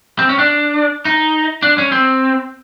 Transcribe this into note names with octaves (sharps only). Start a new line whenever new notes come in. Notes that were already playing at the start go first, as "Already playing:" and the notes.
C4
C#4
D4
D#4
D4
C#4
C4